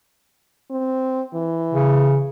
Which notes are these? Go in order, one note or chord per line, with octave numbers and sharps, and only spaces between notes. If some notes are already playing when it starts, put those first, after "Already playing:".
C4
E3
C#3